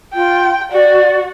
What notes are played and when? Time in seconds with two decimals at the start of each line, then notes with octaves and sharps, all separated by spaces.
0.14 F4 G5
0.72 F#4 D5